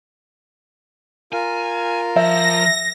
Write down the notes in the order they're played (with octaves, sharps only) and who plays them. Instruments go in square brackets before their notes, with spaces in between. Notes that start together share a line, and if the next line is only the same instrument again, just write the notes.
[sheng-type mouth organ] F4 A#4 F5 [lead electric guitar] G#5
[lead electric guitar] F3 [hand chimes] E5 [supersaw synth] A#6